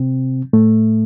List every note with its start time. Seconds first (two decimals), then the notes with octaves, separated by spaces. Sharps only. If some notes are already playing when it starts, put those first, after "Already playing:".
Already playing: C3 C4
0.53 A2 A3